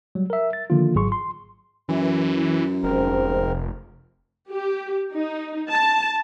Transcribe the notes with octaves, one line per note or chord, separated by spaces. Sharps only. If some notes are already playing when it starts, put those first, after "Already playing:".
F#3 G3
A#4 E5
A6
D3 D#3 F3 A#3 F4
G#1 G#2 F#3 G#4 C6 C#6
C6
F#2 E3
F1 G#2 C4 A#4
G4
D#4
A5